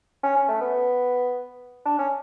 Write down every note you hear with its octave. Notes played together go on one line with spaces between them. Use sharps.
C#4
C#4
A3
B3
D4
C#4